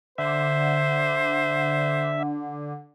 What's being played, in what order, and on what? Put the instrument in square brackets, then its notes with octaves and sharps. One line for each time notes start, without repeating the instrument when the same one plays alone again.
[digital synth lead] D3 [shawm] C5 [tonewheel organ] E5